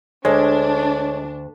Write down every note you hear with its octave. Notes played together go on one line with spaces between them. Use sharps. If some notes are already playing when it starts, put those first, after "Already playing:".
D2 G#3 D4 C#5